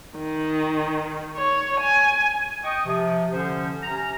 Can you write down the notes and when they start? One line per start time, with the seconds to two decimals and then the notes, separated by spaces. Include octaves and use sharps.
0.18 D#3
1.37 C#5
1.80 G#5
2.63 D#5 G5 C#6 D#6
2.86 C3 F3
3.32 D3 F3 C#4 C5
3.83 C3 C#4 A#5